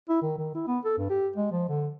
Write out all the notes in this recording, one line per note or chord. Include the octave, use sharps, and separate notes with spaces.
E4
D#3
D#3
E4
B3
A4
G2
G4
G#3
F3
D3